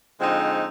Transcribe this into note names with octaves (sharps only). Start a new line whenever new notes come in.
D3 F3 G#3 C4 D#4